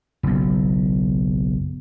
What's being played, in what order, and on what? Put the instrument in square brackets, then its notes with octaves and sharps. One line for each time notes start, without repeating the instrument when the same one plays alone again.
[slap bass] F#1 B1